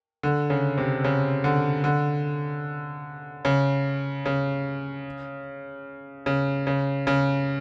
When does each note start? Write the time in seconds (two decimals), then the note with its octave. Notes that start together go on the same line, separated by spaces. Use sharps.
0.23 D3
0.50 C#3
0.78 C3
1.04 C#3
1.44 D3
1.84 D3
3.45 C#3
4.26 C#3
6.26 C#3
6.67 C#3
7.07 C#3